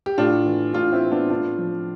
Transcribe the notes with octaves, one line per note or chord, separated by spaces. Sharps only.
G4
A2 D4 F4
E3
A2 D4 F4
C4 E4
E3
B3 D4
A2 D4 F4
F3